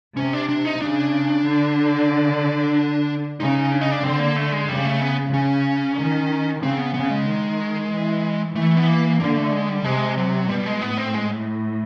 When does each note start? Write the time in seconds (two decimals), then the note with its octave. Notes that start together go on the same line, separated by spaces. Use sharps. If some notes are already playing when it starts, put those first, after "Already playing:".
0.16 C3 C#4
0.33 D4
0.49 D4
0.65 D#4
0.81 C#3 D4
1.45 D3
3.40 C#3 D#4
3.72 D4
3.81 D#4
3.92 D4
4.04 D3 C4
4.20 A#3
4.36 A3
4.52 G#3
4.69 C#3 G3
4.85 A3
5.01 B3
5.33 C#3 C#4
5.98 D#3
6.62 C#3 C4
6.78 B3
6.94 C#3 B3
7.10 G#3
7.26 D#3
7.91 E3
8.56 E3 A3
8.77 B3
8.87 A#3
9.20 D3 A#3
9.36 A3
9.53 G#3
9.69 G3
9.84 C3 G#3
10.18 F#3
10.49 B2 G3
10.66 G#3
10.82 A2 B3
10.98 C4
11.14 G#3